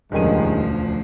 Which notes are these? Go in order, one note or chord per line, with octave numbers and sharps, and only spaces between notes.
E1 D2 G2 D#3 F3 G#3 C#4 D#7